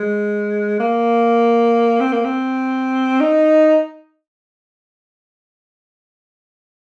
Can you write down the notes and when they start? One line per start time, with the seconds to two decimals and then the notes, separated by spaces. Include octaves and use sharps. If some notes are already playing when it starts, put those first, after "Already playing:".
Already playing: G#3
0.80 A#3
2.00 C4
2.12 A#3
2.25 C4
3.21 D#4